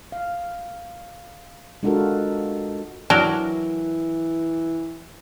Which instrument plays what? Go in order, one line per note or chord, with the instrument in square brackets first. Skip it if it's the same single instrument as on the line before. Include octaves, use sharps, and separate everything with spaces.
[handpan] F5
G#3 D4 F4 F#4 A4 A#4
[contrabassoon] E3 [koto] F#3 A#4 [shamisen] D4